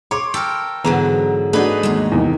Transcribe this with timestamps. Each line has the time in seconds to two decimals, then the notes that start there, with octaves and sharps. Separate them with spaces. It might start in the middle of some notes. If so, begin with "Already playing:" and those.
0.11 C#5 C6 D6
0.34 A4 A#4 G5
0.85 G#2 D3 E3 F#3 B3 A#5
1.53 A3 D4 D#4 F#4 G#4 B4
1.83 D#2 G#3
2.12 E2 C3 D#3